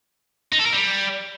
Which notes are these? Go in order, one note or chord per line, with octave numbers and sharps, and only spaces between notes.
D#4
A4
A#4
G3